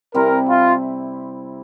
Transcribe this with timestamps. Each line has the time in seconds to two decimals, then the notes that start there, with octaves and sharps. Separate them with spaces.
0.14 C3 G3 C4 E4 A#4
0.50 F4